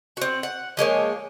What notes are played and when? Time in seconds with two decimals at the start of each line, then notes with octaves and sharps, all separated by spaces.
0.17 C4 F#4
0.43 F#5
0.77 F3 G#3 A#3 C#5